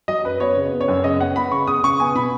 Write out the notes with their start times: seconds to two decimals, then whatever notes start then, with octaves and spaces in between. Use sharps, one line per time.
0.08 F#3 D#5
0.24 F#2 B4
0.40 B3 C#5
0.56 C#3
0.73 B3
0.81 C#5
0.88 F#2
1.04 C#3 D#5
1.20 B3 F#5
1.36 B3 B5
1.52 C#3 C#6
1.67 C#3 D#6
1.83 C#3 C#6
2.00 B3 G#5
2.15 B2 B5